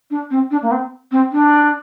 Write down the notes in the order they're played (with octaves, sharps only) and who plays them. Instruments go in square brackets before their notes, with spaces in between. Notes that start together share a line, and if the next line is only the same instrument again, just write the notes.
[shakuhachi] D4
C4
D4
A#3
C4
C4
D4